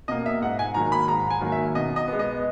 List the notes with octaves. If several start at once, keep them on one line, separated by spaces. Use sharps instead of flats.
B2 A#3 D#5
E5
G#2 F#5
G#5
D#3 F#3 A#3 A#5
B5
G#2 A#5
G#5
D#3 F#3 A#3
E5
B2 D#5
D#5
G#3 B3
D#5